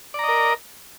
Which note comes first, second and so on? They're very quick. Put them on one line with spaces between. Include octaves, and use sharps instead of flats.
D5 A#5 D#5 A#4